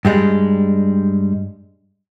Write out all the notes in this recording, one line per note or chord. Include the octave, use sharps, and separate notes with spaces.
G2 G3 G#3